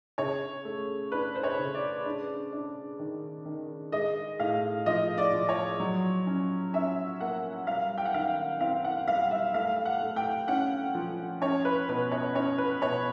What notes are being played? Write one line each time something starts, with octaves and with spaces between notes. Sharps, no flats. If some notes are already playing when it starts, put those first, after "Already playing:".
C#3 C#5
A3
D4 B4
C5
C#5
C#3
D5
D4
D4
D#3
D#3
G#3 D#5
A2 F5
F3 D#5
D5
F3
C#5
F#3
C#4
C#4 E5
A#3 F#5
G3 F5
G5
F#5
D#3 F5
C4 F5
F#5
G3 F5
E5
A3 F5
F#5
A3
G5
C#4 F#5
F3
C#4 C#5
B4
B2 B4
C#5
C#4 C#5
B4
B2 C#5